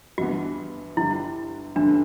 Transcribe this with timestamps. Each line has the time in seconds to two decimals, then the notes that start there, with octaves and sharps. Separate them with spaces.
0.18 G1 G2 E3 B3 F#4
0.97 G1 G2 D3 G3 E4
1.76 G1 F#2 E3 A3 D4